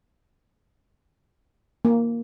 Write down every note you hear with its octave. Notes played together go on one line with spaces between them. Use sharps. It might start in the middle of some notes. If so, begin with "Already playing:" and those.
A#3